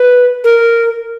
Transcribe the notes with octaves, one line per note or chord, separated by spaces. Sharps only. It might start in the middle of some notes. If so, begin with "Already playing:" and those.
Already playing: B4
A#4